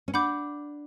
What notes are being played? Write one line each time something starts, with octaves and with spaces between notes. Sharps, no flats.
C#4
D4 F#5 B5 D6 G6